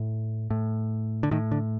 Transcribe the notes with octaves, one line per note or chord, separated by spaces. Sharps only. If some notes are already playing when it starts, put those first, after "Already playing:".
Already playing: A2
A2
D3
A2 D#3
D3